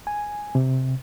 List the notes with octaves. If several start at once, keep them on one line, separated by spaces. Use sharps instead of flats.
G#5
C3